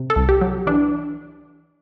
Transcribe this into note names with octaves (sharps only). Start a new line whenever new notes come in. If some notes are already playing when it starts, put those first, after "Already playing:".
Already playing: C3
A4
C2
G4
F#3
E3 D4